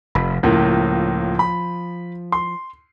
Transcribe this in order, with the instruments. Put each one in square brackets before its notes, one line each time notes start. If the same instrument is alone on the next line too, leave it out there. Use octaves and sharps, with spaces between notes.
[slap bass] F1 [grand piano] B5
[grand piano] C#2 A2 A#3 [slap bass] F3
[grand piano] B5
C6